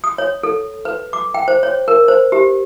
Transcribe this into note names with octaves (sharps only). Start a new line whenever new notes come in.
D#6
C#5
A4
B4
D6
G5
C5
C#5
A#4
C5
G4